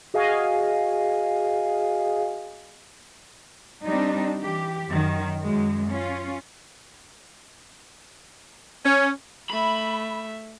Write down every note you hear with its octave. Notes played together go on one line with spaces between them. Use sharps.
F#4 G#4 D#5 F5 G#5
G3 C4 D4 D#4
E3 G4
F#2 D#3
F#2 G#3
C#4 F4
C#4
A3 E5 B5